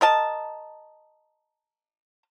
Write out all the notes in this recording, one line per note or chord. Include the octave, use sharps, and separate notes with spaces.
A#4 D#5 A5